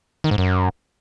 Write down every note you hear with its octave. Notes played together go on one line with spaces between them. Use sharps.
D#3
G#2
F#2